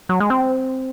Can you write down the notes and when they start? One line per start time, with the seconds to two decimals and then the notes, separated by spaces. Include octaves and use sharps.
0.09 F#3
0.20 G#3
0.30 C4